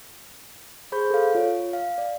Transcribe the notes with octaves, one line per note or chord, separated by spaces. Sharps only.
G#4 C5 B5 C#6 G6
A4 F5
F4 C#5
F5
D5